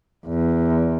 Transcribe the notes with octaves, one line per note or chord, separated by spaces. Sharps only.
E2